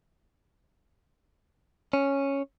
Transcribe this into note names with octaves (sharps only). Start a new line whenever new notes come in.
C#4